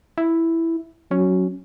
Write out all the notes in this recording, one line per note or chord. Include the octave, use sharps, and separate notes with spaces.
E4
F#3 C#4